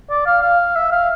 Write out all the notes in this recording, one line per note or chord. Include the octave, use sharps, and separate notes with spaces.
D5
F5
F5
E5
F5